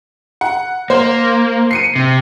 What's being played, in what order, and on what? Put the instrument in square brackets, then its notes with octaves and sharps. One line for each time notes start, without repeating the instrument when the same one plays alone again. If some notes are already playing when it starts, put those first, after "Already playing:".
[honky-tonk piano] F#5
[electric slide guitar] A#3 [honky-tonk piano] C5
[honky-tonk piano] C7 C#7 D#7
[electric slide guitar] C3